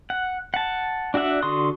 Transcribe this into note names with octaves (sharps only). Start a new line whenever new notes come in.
F#5
F#5 A5
D4 F#4 D5 E5 F#5
D3 F#4 D5 C6 D#6